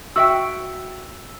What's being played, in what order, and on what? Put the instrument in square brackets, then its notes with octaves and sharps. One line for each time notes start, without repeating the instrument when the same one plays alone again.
[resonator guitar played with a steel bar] F#4 E5 G5 [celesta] E6